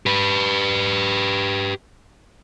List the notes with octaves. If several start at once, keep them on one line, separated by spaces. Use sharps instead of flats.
G4 B4